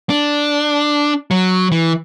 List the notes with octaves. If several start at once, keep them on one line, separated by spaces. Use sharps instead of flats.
D4
F#3
E3